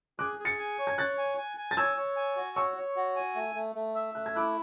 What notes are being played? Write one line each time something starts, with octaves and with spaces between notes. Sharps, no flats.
G#4 D6 F#6
G#4
A6 C#7
G#5
C#5
G#6
C#5 F#6 A6
G#5
G#5
G#5
A6
C#5 E6 G#6
C#5
G#5
F#4
C#5 C#6 E6
C#5
F#4
G#5
A3
A3
A3
E5
A3 F#6
G#6
E4 D6 F#6